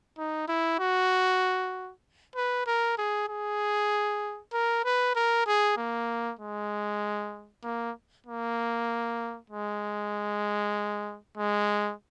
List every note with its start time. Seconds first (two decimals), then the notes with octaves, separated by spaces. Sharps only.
0.18 D#4
0.48 E4
0.79 F#4
2.35 B4
2.66 A#4
2.98 G#4
3.29 G#4
4.53 A#4
4.84 B4
5.15 A#4
5.46 G#4
5.77 A#3
6.39 G#3
7.63 A#3
8.26 A#3
9.50 G#3
11.37 G#3